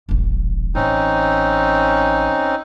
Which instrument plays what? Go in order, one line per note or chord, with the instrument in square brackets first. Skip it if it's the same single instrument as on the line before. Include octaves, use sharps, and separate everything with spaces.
[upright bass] D#1 A1
[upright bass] A1 [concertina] C4 C#4 D#4